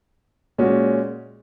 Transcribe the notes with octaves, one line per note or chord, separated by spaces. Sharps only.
A#2 G#3 C#4 F#4